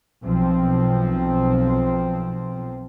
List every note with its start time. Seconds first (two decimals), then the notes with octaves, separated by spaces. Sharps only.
0.24 B1 F3 C4